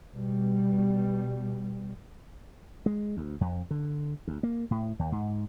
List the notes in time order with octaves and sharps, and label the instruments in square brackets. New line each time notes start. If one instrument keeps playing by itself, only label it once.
[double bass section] B2 G3
[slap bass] G#3
D2
F2
D3
D2
A#3
A2
D#2
G#2